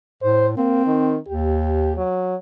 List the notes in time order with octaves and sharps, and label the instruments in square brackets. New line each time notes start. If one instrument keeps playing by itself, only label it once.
[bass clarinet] A2 [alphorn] C5
[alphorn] A#3 [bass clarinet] C4
[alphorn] D#3
[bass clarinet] D#2 [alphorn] G4
[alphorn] F#3